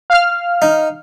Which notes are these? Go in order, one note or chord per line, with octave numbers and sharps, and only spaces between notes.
F5 F6
D#4